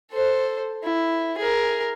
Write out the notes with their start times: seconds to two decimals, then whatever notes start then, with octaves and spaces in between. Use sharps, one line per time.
0.12 A4 C5
0.84 E4
1.38 G#4 A#4